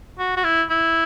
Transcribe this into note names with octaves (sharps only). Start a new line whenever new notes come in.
F#4
F#4
E4
E4